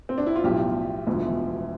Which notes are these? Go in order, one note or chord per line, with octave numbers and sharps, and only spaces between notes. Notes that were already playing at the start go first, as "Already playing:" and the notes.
C4
D4
E4
F4
B1 A2 F3 G4
E1 D2 D3 F3